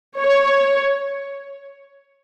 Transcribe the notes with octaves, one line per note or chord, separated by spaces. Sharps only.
C#5